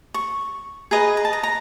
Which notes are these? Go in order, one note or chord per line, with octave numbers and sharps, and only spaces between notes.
C#6
G#4 B4 D#5 A#5
A#5
A5
A#5
A#5